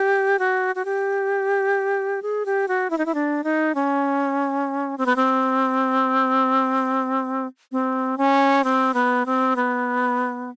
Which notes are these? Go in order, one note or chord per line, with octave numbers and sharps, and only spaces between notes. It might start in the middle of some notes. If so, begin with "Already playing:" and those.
Already playing: G4
F#4
F#4
G4
G#4
G4
F#4
E4
D#4
E4
D4
D#4
C#4
C4
B3
C4
C4
C#4
C4
B3
C4
B3